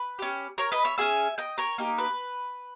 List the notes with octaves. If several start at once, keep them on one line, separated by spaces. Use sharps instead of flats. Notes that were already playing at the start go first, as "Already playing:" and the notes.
Already playing: B4
C#4 G4
A#4 C#5
B4 D#5
C#5 E5
C#4 G#4 E5 G#5
D#5 G5
A#4 C#5
A#3 D#4 G4
B4